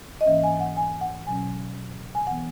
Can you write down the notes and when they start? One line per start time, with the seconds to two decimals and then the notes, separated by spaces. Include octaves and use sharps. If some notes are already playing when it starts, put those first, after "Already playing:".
0.21 D#5
0.26 G#2 E3 A#3 C#4 E5
0.43 G#5
0.60 F#5
0.77 G#5
1.01 F#5
1.27 B2 F#3 C#4 G#5
2.15 G#5
2.27 E3 B3 F#5